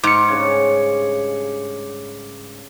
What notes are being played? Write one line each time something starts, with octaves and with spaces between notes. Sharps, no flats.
G#2 D6 C#7
G2 C#3 C#5